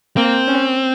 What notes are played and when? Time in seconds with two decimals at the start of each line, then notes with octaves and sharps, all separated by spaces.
0.17 A#3 C4
0.48 C#4